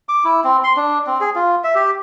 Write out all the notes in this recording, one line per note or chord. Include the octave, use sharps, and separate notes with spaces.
D6
E4
C4
C6
D4
C4
G#4
F4
E5
G4